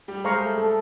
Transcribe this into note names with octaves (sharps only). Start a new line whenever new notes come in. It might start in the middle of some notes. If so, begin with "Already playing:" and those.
G3 G4
G#3 G#4 C5 F5 A#5 C#6
A3 A4
A4